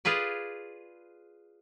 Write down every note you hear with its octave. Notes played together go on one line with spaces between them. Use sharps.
F4 G#4 B4 D5